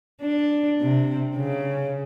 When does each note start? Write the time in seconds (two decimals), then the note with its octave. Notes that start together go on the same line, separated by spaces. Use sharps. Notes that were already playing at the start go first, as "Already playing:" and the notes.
0.22 D4
0.81 C3
1.36 C#3